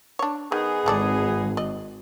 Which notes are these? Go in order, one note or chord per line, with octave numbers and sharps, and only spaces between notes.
D4 C#5
D#3 B3 D#4 G#4
G#1 E3 A4 D5
D5 D#5